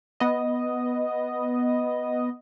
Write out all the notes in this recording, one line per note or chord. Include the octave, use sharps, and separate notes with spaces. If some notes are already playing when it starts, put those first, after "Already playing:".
B3 D#5